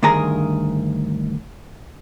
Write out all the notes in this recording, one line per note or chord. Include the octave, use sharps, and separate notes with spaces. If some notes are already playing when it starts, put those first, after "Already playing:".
D2 G2 D#3 G#4 A#4 A#5